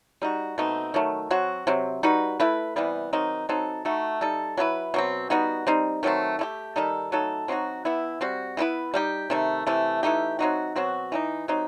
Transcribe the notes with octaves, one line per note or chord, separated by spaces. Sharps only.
G3 D#4 F#4
B2 A3 C4 D#4
D#3 F#3 A3
F#3 C4 F#4
C3 F#3 C4
G3 D#4 F#4 B4
A3 E4 B4
C3 E3 G3 B3
D#3 F#3 C4 D#4
F#3 C4 D#4 A4
A3 D#4 F#4
G3 D#4 A4
F#3 A3 E4 B4
B2 F#3 C4
G3 B3 D#4 F#4
G3 C4 D#4
D#3 F#3 A3 C4
A3 E4 G4
D#3 G3 D#4 A4
F#3 A3 D#4 A4
F#3 C4 D#4 F#4
E3 B3 E4
G3 C4 F#4
E3 B3 E4 B4
G3 D#4 G4
C3 D#3 A3
C3 E3 A3
E3 A3 D#4 G4
F#3 C4 D#4 F#4
B2 F#3 C4 F#4
E3 A3 D#4
F#3 C4 D#4 G4